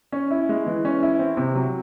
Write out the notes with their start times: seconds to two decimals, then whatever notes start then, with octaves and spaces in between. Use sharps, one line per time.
0.12 C#4
0.31 E4
0.49 G#3
0.67 E3
0.85 C#4
1.03 E4
1.19 C4
1.37 C3
1.55 F#3